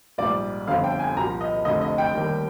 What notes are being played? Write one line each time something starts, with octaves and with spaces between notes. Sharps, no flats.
A#1 G#2 G3 D5
G1 F2 D3 F3 F5
G5
G#5
C2 A#2 F3 A#5
D#5
F1 F2 D3 D#5
D#5
G5
D#2 D#3 G3